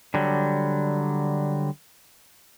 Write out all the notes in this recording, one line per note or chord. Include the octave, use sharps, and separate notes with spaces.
D3 F#3 G3